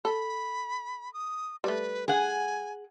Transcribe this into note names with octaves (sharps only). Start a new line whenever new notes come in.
A4 B5
D#6
G3 A3 B4
G#4 F#5 G#5